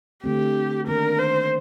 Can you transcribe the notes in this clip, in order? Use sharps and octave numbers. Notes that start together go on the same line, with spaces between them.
D3 A3 C4 G4
D#3 A#3 D4 A#4
C5